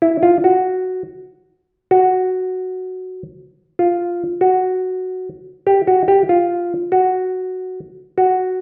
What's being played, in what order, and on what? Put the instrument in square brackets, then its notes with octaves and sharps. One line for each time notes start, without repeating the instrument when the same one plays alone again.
[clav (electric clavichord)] E4
F4
F#4
F#4
F4
F#4
G4
F#4
G4
F4
F#4
F#4